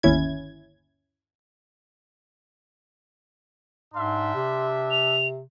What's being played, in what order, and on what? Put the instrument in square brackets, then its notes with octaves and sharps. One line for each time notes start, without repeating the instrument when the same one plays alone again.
[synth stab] G1 D#2 C#4 E4 G#6
[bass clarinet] G#2 [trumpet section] G3 D4 E5 [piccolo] C6
[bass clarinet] C3
[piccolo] F7